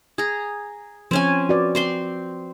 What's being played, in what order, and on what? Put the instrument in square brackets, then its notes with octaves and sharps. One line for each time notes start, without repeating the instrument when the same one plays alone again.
[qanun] G#4 A#5
[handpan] F3 [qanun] C4 C#4 G#5
[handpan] F#4 B4 D5
[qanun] C4 C5 C6